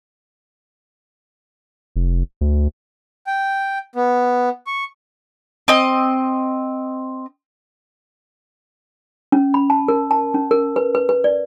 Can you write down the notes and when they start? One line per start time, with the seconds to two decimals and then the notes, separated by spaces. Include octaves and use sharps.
1.96 F1
2.41 D2
3.27 G5
3.96 B3
4.67 C#6
5.68 C4 D#5
9.32 C#4
9.54 B5
9.70 A5
9.88 A#4
10.11 A5
10.34 C#4
10.51 A#4
10.76 B4
10.95 B4
11.09 B4
11.24 D5